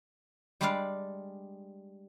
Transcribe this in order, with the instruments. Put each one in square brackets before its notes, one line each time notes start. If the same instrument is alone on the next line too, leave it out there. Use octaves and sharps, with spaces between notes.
[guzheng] G3 G#3 D4 G4 D5 F5